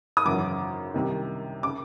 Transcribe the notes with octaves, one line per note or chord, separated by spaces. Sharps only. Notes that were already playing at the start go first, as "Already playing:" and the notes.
D#6
G#1 F#2 C#3 E3 D6
C2 C3 D#3
C#3 D6